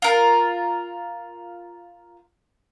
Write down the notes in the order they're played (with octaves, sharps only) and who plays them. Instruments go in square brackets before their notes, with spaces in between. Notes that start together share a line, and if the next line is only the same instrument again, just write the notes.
[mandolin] F4 A#4